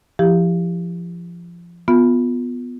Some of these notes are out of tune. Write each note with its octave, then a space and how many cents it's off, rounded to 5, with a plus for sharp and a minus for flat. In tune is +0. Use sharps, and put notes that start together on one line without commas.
F3 -20 E4 -10 G4 +5
B3 +5 F4 +15 E5 +40